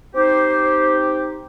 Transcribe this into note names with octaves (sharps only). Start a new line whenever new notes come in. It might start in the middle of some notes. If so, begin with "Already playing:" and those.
C4 D#4 G4 C5